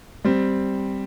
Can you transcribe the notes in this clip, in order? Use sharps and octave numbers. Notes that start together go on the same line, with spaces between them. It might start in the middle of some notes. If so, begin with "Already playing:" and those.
G3 C4